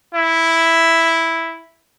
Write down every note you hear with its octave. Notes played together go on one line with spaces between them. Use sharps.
E4